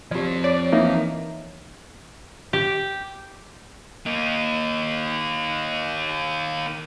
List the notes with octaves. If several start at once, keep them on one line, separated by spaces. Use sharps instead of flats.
F3 C4 G4 D5
C#5 D5
E3 A#3 D#4 E5
G4
A#3 D#4